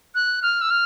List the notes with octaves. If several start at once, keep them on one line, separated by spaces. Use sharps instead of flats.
F#6
F6
E6
F6